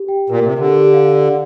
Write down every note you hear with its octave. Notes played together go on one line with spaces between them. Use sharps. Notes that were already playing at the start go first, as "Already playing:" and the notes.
Already playing: G4
G5
A#2 A#4
C3
G4
D3
G4
F5
D5